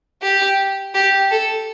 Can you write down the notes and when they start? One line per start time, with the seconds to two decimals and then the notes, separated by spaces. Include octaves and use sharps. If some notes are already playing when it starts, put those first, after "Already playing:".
0.22 G4
0.94 G4
1.31 A4